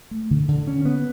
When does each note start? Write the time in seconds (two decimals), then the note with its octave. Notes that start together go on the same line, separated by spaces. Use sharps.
0.11 A3
0.31 D3
0.48 D3
0.67 C#4
0.85 B3